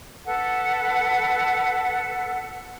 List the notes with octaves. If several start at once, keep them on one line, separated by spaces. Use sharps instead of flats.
A4 B4 F#5